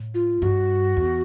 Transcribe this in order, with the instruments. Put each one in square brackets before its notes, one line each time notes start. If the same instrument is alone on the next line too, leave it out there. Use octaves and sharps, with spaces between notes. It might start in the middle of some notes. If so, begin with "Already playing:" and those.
Already playing: [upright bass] A2
[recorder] F4
[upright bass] G2 [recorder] F#4
[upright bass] E2